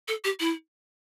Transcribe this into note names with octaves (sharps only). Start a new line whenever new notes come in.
A4
G4
E4